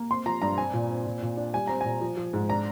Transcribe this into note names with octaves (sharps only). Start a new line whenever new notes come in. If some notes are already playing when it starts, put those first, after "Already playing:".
Already playing: A#3
C4 C6
F3 A#5
G2 A#5
C4 G#5
A#2
C4
A#2
A#2
D4
G3 G#5
C4 A#5
A#2 G#5
F3
F3
G#2
D4 A#5